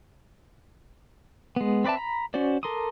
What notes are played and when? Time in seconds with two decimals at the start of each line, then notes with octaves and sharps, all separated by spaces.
1.56 G#3 B3
1.84 C4 B4 D5 E5 A5
1.97 A#5 B5
2.34 C#4 F#4 C5 D5
2.63 A4 A#4 C6 D6 D#6